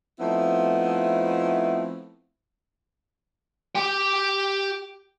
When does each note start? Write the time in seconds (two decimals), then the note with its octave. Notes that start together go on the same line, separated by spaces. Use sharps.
0.20 F3 A3 B3 C4 D#4 E4
3.75 G4 G5